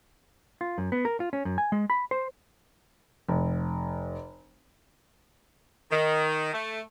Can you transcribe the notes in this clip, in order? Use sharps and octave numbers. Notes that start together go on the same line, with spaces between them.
F4
F#2
B3
A#4
F4
C#4
F#2
G#5
G#3
B5
C5
F1
D#3
A3